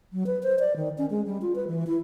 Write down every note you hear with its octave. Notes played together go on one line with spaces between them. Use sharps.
F#3
B4
C5
D5
D#3
C#4
G#3
G3
F4
B4
E3
E4